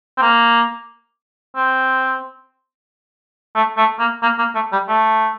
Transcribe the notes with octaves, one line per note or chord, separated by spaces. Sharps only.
C4
A#3
C4
A3
A3
A#3
A#3
A#3
A3
G3
A3